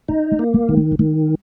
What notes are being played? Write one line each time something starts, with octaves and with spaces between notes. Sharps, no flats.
C#4 D#4
C#4
A#3
C4
D#3 G#3
A#3
A#3
D#3 G#3